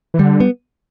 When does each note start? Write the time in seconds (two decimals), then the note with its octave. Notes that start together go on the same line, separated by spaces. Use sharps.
0.14 E3
0.19 D3 G3
0.40 B3